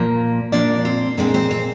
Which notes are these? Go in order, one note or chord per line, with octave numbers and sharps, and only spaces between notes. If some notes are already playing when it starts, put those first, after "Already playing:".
Already playing: A#2 F3 A#3
A#2 F3 A#3 D4 D5
C4 C5
A#2 G#3 C4 D4 D5
C4 C5
C4 C5